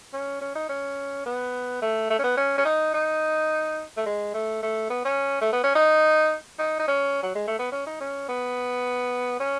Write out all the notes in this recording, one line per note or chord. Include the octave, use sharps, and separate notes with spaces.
C#4
C#4
D#4
C#4
B3
A3
A3
C#4
B3
C#4
C#4
D#4
D#4
A3
G#3
A3
A3
B3
C#4
A3
B3
C#4
D#4
D#4
D#4
C#4
F#3
G#3
A3
B3
C#4
D#4
C#4
B3
C#4